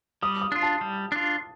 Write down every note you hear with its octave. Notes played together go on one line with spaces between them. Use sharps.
G3 D#6
D#6
D4 F4
A5
G3
D4 F4